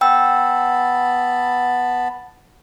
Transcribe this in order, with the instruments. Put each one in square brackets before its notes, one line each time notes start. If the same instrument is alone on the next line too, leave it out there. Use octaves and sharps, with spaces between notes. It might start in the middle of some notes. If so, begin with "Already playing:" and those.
[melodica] B3 A5 B5 [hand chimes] G5 E6